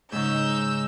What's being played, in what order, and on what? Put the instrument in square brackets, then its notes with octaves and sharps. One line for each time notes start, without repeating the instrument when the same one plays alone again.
[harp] G#2 C#3 [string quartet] D#4 E6 G6